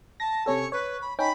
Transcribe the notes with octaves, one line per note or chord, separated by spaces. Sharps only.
A5 A#6
C3 C#4 A4 C#5
B4 C#5
B5
C#4 D#4 G5 B5